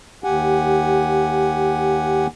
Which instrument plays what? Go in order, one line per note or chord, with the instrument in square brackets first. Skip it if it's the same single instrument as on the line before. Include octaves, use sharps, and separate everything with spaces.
[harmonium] D#2 G4 F#5 G#5